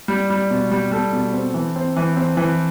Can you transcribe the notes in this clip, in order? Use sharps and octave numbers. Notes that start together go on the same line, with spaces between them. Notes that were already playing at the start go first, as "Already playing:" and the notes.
G3
G3
B2
G3
G3 A4
B2
C4
E3
C4
E3
C4
E3